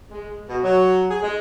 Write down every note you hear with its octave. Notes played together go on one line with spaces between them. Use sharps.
G#3
B2
F#3
G#4
G#3